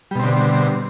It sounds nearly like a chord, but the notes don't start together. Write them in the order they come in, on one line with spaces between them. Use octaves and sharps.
G3 B2 C4 D3